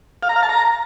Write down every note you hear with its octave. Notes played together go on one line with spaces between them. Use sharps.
F5
A#5
F5
A5
A#5